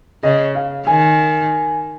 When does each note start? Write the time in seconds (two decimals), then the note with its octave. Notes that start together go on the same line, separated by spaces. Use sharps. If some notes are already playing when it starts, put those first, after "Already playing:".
0.23 C#3 D#5
0.55 F5
0.87 D#3 G#5